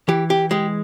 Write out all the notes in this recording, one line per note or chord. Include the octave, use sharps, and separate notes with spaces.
E3 G4
G4
G#3 G4